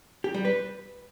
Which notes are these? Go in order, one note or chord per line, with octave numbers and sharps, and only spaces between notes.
G4
G3
B4